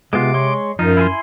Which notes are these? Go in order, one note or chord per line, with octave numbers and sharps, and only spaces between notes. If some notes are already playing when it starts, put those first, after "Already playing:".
C3 G#3 B3 F4 D6
G#3 C#5 C6
F#2 F3 D#4
E4 G#5 C6